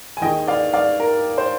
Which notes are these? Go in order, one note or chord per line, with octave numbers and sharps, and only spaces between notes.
G#5
D#2 D#3 G#3 D#5 G5
D5 F5
D5 F5
A#4
C5